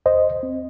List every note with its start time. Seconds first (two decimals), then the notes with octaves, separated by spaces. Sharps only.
0.06 D#2 C5 D#5
0.43 C4